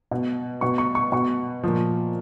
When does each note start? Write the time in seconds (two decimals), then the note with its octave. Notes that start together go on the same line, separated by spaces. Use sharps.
0.11 B2
0.61 B2 C#6
0.78 C#6
0.95 C#6
1.12 B2 C#6
1.63 A#2 F3